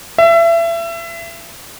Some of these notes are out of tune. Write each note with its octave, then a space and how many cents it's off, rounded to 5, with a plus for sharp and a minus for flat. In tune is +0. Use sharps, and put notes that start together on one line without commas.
E5 +30